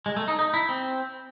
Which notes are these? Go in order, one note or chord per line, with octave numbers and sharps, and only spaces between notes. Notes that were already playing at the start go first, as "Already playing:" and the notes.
G#3
A3
D#4
D#4
E4
C4